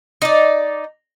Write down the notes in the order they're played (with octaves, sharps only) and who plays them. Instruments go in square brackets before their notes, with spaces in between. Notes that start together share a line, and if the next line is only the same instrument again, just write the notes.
[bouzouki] D#4 D5